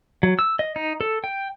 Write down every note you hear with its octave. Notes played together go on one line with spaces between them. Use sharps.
F#3
E6
D#5
D#4
A4
G5